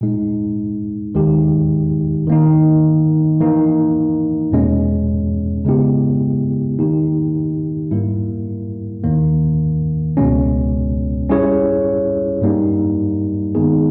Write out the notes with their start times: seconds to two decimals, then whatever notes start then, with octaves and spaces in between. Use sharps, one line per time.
0.01 A#2 G#3 D#4
1.15 D#2 D#3 G#3 D#4 G4
2.27 D#3 A#3 D#4
3.40 E3 A#3 D#4
4.52 E2 B2 G#3 C#4
5.65 C#3 G#3 B3 E4 G4
6.78 D#3 A#3 D#4 G4
7.91 G#2 G3 A#3 E4 A#4
9.04 D#2 D#3 A#3
10.17 C#2 B2 G#3 C#4
11.30 G3 C#4 E4 G#4 C#5
12.41 G2 G3 A#3 D#4
13.55 D#3 G#3 B3 D#4 G#4